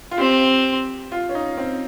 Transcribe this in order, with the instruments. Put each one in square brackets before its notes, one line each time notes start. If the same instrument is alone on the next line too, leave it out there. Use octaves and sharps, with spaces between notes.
[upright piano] F4
[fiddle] C4 [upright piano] G4
[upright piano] F4
C#4
D#4
C4